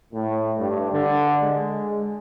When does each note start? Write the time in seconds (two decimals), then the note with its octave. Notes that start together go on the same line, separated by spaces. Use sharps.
0.12 A2
0.57 G2
0.92 D3
1.41 G#3